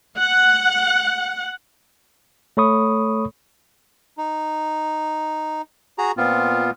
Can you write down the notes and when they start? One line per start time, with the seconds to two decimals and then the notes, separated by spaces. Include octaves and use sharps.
0.18 F#5
2.57 A3 A4 C#5 B5 C#6 D#6
4.18 D#4
5.98 F#4 G#4 A#5
6.17 A#2 B3 C4 F4